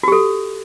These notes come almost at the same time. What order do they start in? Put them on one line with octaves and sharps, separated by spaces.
F#4 G4 A4